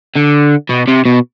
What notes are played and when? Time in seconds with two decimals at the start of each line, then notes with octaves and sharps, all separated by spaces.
0.16 D3
0.70 B2
0.88 C3
1.05 B2